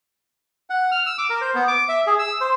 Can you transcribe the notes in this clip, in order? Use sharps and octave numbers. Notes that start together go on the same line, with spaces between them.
F#5
F6
E6
D6
A#4
C5
B3
D6
E5
G#4
E6
C5